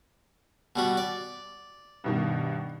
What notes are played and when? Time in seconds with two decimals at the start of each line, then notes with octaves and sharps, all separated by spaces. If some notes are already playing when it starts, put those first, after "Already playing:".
0.76 B2 G3 F#4
0.97 D5
2.04 G2 B2 D#3